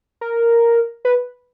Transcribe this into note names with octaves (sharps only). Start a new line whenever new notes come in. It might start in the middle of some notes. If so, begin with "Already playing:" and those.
A#4
B4